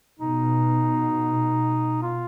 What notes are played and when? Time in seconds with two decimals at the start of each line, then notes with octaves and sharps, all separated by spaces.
0.19 B2 D#4
2.02 F4